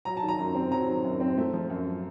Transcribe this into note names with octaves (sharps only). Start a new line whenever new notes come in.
F#3 A#5
A5
D#3
A#5
F#2
C4
F#3 A#5
D#3
F#2
C4
A3
F3
F#2